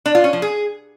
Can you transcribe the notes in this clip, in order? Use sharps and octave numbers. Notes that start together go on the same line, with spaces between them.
D4
F4
C#4
F3
G#4